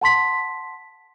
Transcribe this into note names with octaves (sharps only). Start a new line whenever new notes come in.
F#5 A5 C6 B6